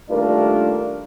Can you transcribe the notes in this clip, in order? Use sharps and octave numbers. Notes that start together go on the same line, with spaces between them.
D#2 G3 A3 D4 F4 A#4